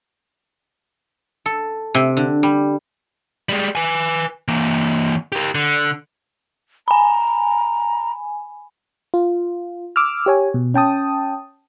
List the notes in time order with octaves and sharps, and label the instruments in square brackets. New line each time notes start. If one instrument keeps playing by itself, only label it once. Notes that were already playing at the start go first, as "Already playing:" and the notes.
[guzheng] A4
C3
D3
G3
[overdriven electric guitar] G3 G#3
B4 G#5
E3 A#3
G4 A#4
D3
[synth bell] G#5 B5 [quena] A#5
[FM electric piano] F4
D6 E6 F6
G4 C#5 G#5
B2
C#4 G5 A5 D#6